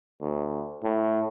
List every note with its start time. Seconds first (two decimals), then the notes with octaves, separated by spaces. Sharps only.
0.21 D2
0.84 A2